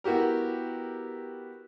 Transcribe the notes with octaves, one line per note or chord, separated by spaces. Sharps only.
B3 E4 F#4 G4 A#4